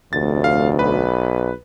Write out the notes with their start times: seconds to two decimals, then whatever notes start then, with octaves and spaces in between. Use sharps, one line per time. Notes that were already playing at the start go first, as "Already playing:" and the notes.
0.13 F1 D2 A6
0.44 F5
0.79 B1 B4